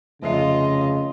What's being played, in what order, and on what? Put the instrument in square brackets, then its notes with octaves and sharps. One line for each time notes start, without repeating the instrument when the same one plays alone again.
[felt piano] F1 E5 C7 [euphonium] C#3 [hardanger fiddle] F4 D#5